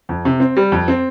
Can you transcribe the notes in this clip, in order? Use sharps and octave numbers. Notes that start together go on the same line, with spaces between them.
F2
C3
C4
G3
F2
C4